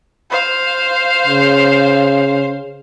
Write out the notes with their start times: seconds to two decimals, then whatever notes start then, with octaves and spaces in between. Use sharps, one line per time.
0.31 C5 F5
1.27 C#3